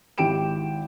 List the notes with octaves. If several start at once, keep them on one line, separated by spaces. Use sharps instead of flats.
G#1 E4 G4 G5 D7 E7